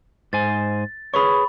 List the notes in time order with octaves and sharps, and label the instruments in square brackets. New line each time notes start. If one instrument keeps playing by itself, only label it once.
[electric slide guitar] G#2 C5 G#5 [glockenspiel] A6
[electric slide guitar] G#4 B4 C#5 [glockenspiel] B5 C#6